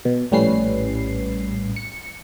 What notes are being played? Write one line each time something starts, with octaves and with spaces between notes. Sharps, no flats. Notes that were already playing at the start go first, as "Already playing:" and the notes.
B2
A#1 A2 G3 C#4 B4 C7
C#7